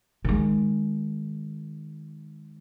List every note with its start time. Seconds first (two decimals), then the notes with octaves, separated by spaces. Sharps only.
0.25 D#3 G#3